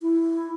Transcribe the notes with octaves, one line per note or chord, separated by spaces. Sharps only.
E4